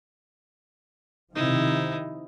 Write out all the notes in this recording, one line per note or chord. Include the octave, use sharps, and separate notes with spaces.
C3 D#3 F3 D#4 E4